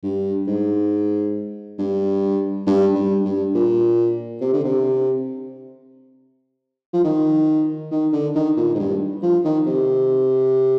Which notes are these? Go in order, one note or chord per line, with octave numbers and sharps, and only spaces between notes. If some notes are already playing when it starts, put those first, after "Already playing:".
G2
G#2
G2
G2
G2
G2
A#2
C3
D3
C3
F3
D#3
D#3
D3
D#3
A#2
G#2
G2
F3
D#3
C3